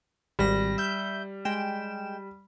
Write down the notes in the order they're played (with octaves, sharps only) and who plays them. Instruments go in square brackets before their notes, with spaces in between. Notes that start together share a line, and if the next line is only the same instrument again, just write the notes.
[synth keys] G#1 A#6 [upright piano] G3
[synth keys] E5 G6
G#3 G5 E7